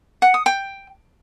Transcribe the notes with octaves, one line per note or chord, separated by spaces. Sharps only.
F#5
D#6
G5